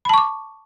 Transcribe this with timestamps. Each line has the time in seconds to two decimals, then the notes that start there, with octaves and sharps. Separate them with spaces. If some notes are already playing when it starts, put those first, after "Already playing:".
0.05 B5
0.09 A5
0.14 C#6
0.18 D6